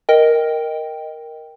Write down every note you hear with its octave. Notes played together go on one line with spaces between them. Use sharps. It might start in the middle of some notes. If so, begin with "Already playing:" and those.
A#4 D#5 G5